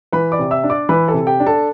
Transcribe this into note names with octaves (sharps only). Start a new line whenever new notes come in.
E3 B4 B5
D5 D6
C3
E5 E6
D4
D5 D6
E3 B4 B5
A4 A5
C3
G4 G5
D4
A4 A5